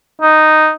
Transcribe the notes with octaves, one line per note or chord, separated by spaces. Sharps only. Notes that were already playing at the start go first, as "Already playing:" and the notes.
D#4